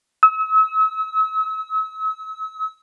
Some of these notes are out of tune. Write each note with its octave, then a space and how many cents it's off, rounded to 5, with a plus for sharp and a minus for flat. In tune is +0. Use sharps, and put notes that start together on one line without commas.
E6 -40